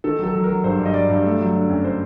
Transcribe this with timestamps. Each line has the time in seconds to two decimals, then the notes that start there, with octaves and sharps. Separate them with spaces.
0.04 D#3 A4
0.19 F#3 A4
0.34 F#3
0.44 A#4
0.49 F#3
0.64 G2 C5
0.79 G2
0.85 D#5
0.94 F#3 D5
1.10 G2
1.24 A3
1.39 F#3
1.54 D3
1.69 F#2
1.84 C5